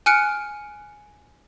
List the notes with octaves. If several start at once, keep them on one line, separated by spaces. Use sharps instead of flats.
G#5 F6 F#6 C#7 D7